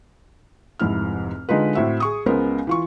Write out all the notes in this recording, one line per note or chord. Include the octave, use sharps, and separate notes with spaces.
F1 G#2 E4 F6
D3 G#3 D#4 F4 B4
A2 C4 F#4 E5
G#4 C#6 D#6
C#2 C#3 G#3 B3 A#4 C5
E3 F4 C#6